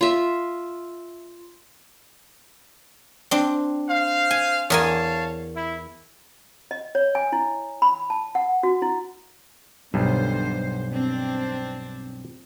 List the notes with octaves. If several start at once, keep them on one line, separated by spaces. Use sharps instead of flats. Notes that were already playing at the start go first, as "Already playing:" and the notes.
F4 E5
C4 D4
C5 F5
G#5
E2 A#4 C#5 F5 G#5 A5
E4
D#5
C#5
G#5
E4
B5
A5
F#5
F#4
E4
B1 G2 D3 C5
C4 D4